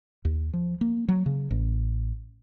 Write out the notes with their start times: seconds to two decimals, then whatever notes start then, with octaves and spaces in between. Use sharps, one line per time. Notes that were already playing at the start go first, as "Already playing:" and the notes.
0.25 D#2
0.54 F3
0.81 A#3
1.08 F#3
1.26 C#3
1.51 A1